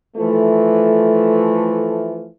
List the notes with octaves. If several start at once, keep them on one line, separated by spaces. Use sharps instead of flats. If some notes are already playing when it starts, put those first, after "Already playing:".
E3 F3 A3